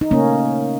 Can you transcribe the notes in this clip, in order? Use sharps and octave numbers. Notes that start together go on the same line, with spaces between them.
D#4
C#3 A3 A#3 C#4